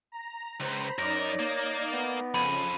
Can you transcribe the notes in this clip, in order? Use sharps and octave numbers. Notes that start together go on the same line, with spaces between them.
A#5
C#2 C5 A#5 B5
F#2 D#4 A#4 C#5 D5 A#6
A#3
B3
F2 C#3 B5 D#7